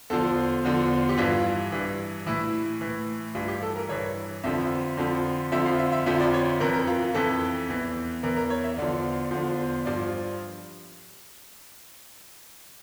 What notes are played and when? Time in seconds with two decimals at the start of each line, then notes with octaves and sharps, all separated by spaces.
0.10 E2 D3 F3 A4
0.64 E2 D3 F3
1.09 G4
1.18 G2 E3 F4
1.72 G2 E3
2.26 A2 E3 E4
2.81 A2 E3
3.35 G2 E3 F4
3.48 G4
3.62 A4
3.76 A#4
3.89 G2 E3 C#5
4.44 F2 D3 F3 E5
4.97 F2 D3 F3
5.52 F2 D3 F3 E5
5.66 F5
5.79 E5
5.92 E5
6.06 F2 D3 F3 E5
6.20 D5
6.34 C#5
6.60 F2 E3 A#4
6.74 A#4
6.87 F4
7.15 F2 E3 A4
7.69 E2 E3
8.23 E2 E3 A#4
8.37 A#4
8.50 C#5
8.64 E5
8.77 E2 D3 F3 D5
9.31 E2 D3 F3
9.86 G2 F3 D5